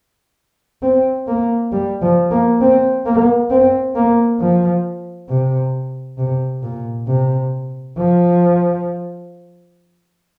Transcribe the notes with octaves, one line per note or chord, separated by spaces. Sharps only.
C4
A#3
G3
F3
A#3
C4
A#3
C4
A#3
F3
C3
C3
A#2
C3
F3